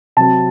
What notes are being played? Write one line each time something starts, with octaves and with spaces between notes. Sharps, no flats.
C3 F#3 C4 A5